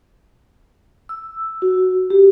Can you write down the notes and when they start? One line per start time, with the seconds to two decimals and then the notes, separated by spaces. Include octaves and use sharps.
1.09 E6
1.62 F#4
2.10 G4